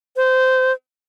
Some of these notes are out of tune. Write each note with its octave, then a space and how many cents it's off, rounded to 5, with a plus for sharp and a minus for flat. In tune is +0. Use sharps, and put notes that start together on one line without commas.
C5 -20